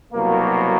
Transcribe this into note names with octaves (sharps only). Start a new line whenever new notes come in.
C2 B2 F#3 A#3